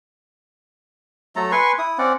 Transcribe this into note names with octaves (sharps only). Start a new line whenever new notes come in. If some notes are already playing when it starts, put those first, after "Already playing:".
F#3 A3 A4 A#5
B4 G#5 C6 C#6
E4 D#6
C4 C#4 D5 F#5